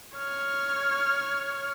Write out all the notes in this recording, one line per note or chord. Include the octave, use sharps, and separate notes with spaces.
C#5 F6